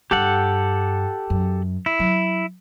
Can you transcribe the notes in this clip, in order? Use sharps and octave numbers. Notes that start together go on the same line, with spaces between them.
G2 G4 A4 F#5
F#2
E4
F#3